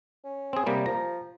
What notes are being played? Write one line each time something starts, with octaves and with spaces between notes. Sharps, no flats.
C#4
C4 G#4
C3 G3 A#3
F3 A#5